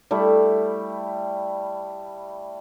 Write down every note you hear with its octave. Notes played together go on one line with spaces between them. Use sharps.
G3 A3 E4